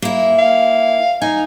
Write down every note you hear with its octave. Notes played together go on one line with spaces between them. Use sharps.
A#3 E4
F5
D#4 G#5